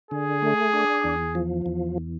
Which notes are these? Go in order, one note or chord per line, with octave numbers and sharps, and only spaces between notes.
D3 G#4
A3
D4
E2
F3
E2